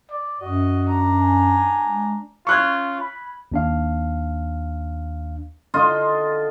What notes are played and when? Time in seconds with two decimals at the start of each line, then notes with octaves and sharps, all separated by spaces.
0.10 D5
0.41 F#2 F#4 D#5
0.88 D4 A#5
1.20 G#5
1.84 G#3
2.47 C#4 F4 C#6 F#6 G#6
3.00 B5
3.52 D#2 D4 F5
5.74 D3 F4 D#5 C6